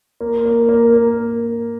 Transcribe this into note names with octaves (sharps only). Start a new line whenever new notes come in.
A#3
A#3
A#3
A#3